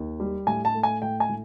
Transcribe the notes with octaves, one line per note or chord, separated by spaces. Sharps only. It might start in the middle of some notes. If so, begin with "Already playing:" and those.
Already playing: D#2
G3
A2 G#5
A5
A3
G#5
A2 G5
G#5
A2